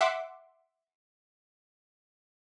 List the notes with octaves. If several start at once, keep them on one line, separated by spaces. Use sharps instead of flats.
E5 F#5 C6 D6